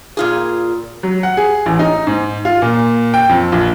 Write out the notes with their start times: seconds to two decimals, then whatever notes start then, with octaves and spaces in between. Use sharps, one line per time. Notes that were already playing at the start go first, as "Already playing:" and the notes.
0.17 A#2 F4 G#4
1.03 F#3
1.23 F#5
1.37 G#4
1.66 A1
1.79 D#4
2.07 G#2
2.45 F4
2.62 A#2
3.14 G5
3.29 F2
3.52 A#1